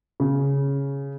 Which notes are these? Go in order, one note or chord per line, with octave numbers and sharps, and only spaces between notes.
C#3